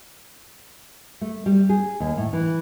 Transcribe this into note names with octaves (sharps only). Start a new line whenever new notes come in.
A3
G3
G#4
D#2
A2
E3